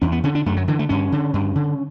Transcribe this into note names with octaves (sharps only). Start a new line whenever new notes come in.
E2 C#4
B3
D3 C#4
D4
F#2 A3
F#3
D3 E3
A3
G2 C#4
D3
G2
D3